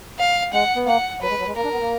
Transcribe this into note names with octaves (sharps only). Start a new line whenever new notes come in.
F5
G#3 F#5
B3
A#3 F#5
F#3 B4
G#3
F#3
G#3
A#3 A#4
D4
B3
A#3